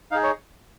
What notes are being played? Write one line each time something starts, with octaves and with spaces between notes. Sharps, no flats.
D#4 G#4 F5
C#5